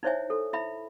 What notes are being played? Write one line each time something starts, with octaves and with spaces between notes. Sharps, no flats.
D#4 E4 C5 C#5 E5 G#5
A4
E4 E5 B5